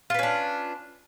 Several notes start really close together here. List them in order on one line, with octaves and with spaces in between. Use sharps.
F4 B4 C#4 D4